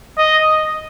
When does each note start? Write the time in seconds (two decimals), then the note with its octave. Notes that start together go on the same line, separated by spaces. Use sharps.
0.18 D#5